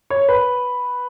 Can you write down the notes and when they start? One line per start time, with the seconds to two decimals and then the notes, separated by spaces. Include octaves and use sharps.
0.10 C#5
0.29 B4